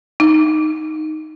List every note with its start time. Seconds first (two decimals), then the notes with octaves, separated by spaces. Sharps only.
0.20 D#4